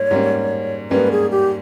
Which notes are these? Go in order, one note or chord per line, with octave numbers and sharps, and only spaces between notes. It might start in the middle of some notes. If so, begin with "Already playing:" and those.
Already playing: G#2 G3 A#3 C#5
G#2 G3 A#3 C#4
G#2 G3 A#3 C#4 B4
G#4
G4